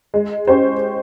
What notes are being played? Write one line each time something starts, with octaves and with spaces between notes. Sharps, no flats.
G#3
C#4 G4 C5